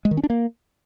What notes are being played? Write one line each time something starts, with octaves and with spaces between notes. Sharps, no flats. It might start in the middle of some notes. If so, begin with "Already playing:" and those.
G#3
D#3
C#4
D4
A#3